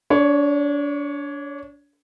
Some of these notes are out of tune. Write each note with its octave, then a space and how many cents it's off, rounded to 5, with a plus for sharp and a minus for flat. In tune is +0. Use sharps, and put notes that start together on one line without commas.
D4 -30 C#5 +0